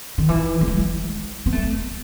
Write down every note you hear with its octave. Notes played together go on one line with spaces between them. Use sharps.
D#3
E3
A3
G#3
B3
A3